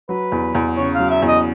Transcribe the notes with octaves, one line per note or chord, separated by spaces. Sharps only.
F#3 B4
E2
E2
C#3 C#5
F5
F#3
E5
E2
D#5